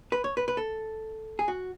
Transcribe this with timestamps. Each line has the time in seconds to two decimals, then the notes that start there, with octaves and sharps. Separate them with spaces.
0.12 B4
0.24 C#5
0.37 B4
0.48 B4
0.57 A4
1.39 G#4
1.48 F#4